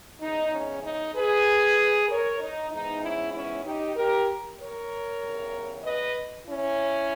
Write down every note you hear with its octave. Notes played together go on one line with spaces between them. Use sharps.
E2 C#3 G#3 D#4
C#4
D#4
G#4 B4
A#4 C#5
D#4
G#2 E3 G#3 B3 D#4
C#4 E4
C#4 E4
D#4 G4
G4 A#4
A#4 C#5
E2 C#3 G3
B4 D#5
C#4 E4